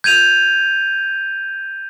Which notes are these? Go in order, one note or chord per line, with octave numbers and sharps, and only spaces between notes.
G6 G#6 D#7 F7